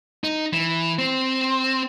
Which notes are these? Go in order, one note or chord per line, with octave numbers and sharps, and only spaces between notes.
D#4
E3
C4